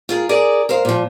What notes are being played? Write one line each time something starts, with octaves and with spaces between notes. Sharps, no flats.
F4 G#4 A#4
G#4 A#4 D5
A#4 C5 F5
A#2 F3